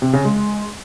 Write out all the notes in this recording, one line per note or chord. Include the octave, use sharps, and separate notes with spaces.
C3
C#3
G#3